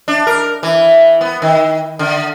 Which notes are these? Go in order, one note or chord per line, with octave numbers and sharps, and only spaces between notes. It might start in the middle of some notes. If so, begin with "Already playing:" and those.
D4
A#4
E3
B3
D#3
D3